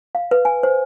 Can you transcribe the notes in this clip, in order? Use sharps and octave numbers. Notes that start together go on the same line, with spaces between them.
F5
B4
G#5
C5